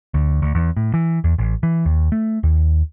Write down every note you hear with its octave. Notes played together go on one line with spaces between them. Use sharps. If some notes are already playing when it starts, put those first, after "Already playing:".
D2
D2
E2
A2
E3
E2
A1
E3
D#2
A3
D#2